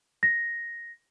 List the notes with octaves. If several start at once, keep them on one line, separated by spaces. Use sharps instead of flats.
A#6